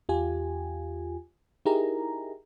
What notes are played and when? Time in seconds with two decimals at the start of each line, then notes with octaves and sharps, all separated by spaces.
0.09 E2 F4 G4 G#5
1.65 D#4 E4 G4 G#4 A#4 A#5